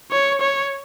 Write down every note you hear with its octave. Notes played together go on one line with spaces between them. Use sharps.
C#5
C#5